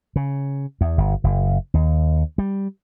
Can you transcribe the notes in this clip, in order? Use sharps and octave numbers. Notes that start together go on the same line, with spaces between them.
C#3
E2
G1
F#1
D#2
G3